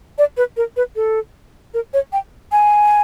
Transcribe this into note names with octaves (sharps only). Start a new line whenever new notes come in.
D5
B4
A#4
B4
A4
A#4
C#5
G5
G#5